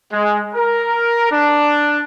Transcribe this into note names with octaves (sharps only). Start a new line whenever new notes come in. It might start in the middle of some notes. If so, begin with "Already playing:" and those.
G#3
A#4
D4